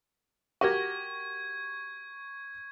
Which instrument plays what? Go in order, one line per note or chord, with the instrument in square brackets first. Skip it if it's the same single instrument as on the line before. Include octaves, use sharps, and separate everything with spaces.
[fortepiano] F#4 G4 A#4 [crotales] C#6 G#6